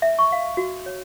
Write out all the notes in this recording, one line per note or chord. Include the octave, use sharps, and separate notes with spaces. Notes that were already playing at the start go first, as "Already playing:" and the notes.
E5
C#6
F5
F#4
C#5